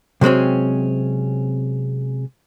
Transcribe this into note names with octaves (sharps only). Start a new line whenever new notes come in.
C3 F#3 G#3 C4 C#4